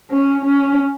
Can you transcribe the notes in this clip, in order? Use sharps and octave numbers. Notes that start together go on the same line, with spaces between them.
C#4
C#4